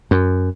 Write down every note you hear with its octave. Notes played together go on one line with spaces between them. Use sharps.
F#2